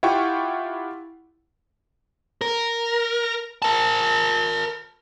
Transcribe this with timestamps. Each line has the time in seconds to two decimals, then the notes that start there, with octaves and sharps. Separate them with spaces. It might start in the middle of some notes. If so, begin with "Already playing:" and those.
0.03 E4 F4 G4 F#5 G5 C#6
2.41 A#4
3.62 A#4 A5